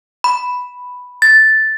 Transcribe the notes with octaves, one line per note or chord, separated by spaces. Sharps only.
B5
A6